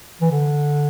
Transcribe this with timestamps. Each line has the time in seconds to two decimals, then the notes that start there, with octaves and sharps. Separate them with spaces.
0.22 E3
0.31 D3